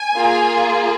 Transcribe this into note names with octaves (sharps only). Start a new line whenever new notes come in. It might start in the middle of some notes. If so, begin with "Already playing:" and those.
Already playing: G#5
A#3 F4 G#4